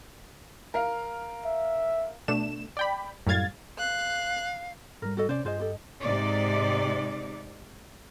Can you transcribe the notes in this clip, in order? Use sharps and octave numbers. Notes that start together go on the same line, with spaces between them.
A#4 F5
E5
B2 A3 D4 E7
D5 G5 B5
F#2 A2 G3 F5 G#6 A6
F5 F#6
G#2 G3 A#4
F#4 A4 D#5
C3 C#4 C5 D5
G2 F4 G#4 C5 D#5
G4 A4
G#2 C3 D#4 D5